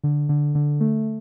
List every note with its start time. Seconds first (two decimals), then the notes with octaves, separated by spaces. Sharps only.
0.04 D3
0.29 D3
0.55 D3
0.80 A3